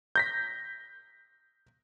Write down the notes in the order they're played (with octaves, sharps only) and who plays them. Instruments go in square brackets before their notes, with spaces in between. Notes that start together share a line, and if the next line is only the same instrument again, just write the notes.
[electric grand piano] G6 A#6 B6